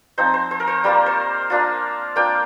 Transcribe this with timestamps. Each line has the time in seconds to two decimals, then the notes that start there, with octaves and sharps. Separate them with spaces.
0.18 F3 C4 D#4 C5
0.34 C5
0.51 C5
0.60 A#4
0.67 C5
0.84 G3 A#3 F4 A#4
1.06 C5
1.50 A#3 D4 F4
2.16 A#3 D4 F4 G5